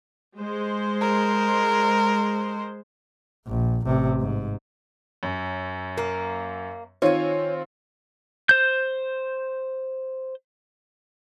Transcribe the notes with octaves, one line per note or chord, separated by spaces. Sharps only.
G#3 C5
A#4
A#1
A1 C3
G#2
F#2
A#3
D#3 C4 F4 C#5 G#5
C5 G6